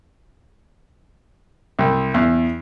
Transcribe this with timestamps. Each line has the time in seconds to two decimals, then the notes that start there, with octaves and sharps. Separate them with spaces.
1.79 C2
2.14 E2